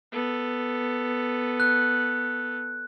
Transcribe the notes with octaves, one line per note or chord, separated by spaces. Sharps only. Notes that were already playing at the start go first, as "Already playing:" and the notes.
B3 A4
F#6